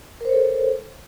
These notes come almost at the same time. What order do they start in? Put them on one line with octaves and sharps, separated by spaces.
A#4 C5 C#5 A4